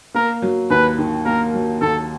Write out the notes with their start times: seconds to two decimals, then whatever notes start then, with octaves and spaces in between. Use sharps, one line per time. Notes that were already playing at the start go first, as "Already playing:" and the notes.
0.14 A#3 A#4
0.42 F#3
0.70 D#2 B4
0.98 D#3
1.25 A#3 A#4
1.54 F#3
1.81 D#2 A4